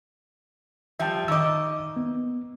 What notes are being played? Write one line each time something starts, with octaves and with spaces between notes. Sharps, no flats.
F3 G3 E5 G5 A5
D#3 D#5 D6 E6
B3